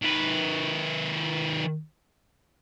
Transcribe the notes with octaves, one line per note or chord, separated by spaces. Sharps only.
D#3 B4